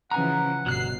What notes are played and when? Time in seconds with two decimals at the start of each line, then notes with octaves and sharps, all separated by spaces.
0.11 C#3 E3 F3 F#5 G#5 A#5
0.66 G1 B2 F#3 F#6 C7